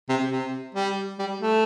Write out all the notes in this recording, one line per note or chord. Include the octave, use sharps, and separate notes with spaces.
C3
C3
G3
G3
A3